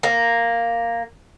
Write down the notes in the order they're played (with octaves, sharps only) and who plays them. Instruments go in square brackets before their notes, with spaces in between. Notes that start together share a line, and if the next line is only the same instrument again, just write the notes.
[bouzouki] A#3